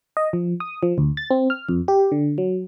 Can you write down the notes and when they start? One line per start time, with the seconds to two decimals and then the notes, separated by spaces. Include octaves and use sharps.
0.17 D#5
0.33 F3
0.60 D#6
0.83 F3
0.98 D2
1.17 A6
1.31 C4
1.50 F6
1.69 F2
1.88 G4
2.12 D3
2.38 F#3